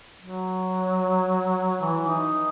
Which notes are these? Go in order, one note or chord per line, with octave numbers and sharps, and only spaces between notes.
F#3
E3
D#4